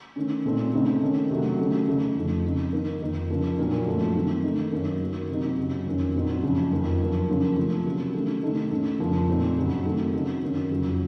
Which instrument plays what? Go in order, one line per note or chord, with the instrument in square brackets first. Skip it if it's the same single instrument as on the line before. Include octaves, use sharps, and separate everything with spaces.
[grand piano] D#3 A3 C#4
A#2 A3 C4 D#4
C#3 A3 C4 D#4
D#3 A3 C#4
C3 D#3 F#3 A3
D#3 A3 C#4
C#3 A3 D#4
F2 C#3 F3 A3
C#3 F3 C4 D#4
D#3 A#3 D#4
F2 D#3 A#3 D#4
C#3 F3 A#3 C#4
A#2 F#3 A#3 D#4
F#2 F3 A3
D#3 A3 C4
D#3 A3 D#4
F#2 D#3 A#3 C#4
D#3 F#3 A#3
C3 F#3 C4 D#4
F#2 C#3 F#3
F2 D#3 A#3 C#4
A#2 F#3 C4 D#4
F#2 C#3 F3
F2 D#3 A#3 C#4
F#2 F3 A#3
C#3 F3 A#3 C#4
C3 F3 A3
C3 F#3 A#3 C#4
D#3 A3 C#4
C3 D#3 A3 D#4
A2 A3 C#4
F2 C#3 F3 A#3
A#2 A3 C4 D#4
F#2 C#3 F#3
D#3 A3 C4
C#3 F#3 C4 D#4
F#2 D#3 A#3 C#4
F2 C#3 F#3